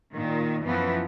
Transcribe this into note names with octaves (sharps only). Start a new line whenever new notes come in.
A#2 D#3
F#2 E3 F3 B3